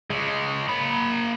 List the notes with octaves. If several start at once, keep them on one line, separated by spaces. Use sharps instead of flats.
C#3 G#3
A#3 B5